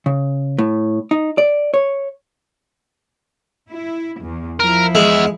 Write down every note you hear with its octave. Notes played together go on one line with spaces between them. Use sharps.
C#3
A2
D#4
D5
C#5
E4
E2
F3 E4 A#4
E2 G#3 E5